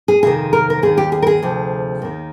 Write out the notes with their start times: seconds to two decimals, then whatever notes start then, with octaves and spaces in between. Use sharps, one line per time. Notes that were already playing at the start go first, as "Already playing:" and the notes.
0.08 G#4
0.23 F2 C3 D#3 G#4
0.53 A#4
0.70 A#4
0.82 D#2 D#3 G#4
0.98 G4
1.12 G#4
1.22 A#4
1.27 G#4
1.42 D2 C3 F3
2.02 D#2 D#3